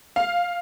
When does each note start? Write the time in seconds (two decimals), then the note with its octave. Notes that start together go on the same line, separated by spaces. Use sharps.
0.16 F5